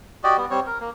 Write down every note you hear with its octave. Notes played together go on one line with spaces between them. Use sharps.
F#4 G4 D5 D#5
G3 B3
G3 C4 C#5
A#4
A#3